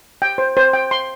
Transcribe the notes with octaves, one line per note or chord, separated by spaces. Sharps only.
G5
C5
C5
G5
C6